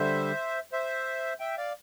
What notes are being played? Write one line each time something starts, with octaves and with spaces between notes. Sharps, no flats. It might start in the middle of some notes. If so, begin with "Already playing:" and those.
Already playing: D3 G3 C5 E5
C5 E5
E5 G5
D5 F5